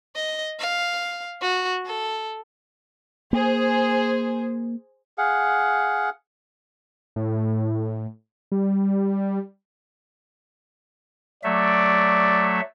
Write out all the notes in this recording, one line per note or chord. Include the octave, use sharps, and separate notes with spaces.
D#5
F5
F#4
A4
A#3 G#4 C5
G#4 F5 F#5
A2
G3
F#3 A3 D5 E5